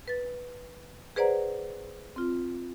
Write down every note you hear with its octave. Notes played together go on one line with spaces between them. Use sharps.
B4 A6
G#4 B4 C5 D5 F#5 A#5
C4 F4